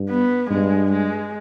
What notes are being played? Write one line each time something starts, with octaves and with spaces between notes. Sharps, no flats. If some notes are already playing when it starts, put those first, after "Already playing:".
Already playing: G2
B3
G2 G#3
G#3